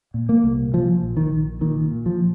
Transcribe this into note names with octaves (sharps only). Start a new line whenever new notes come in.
A#2
A#3
C2
A#2 F3
A#1
D#3
A#1
A#2 D#3
A#2
F3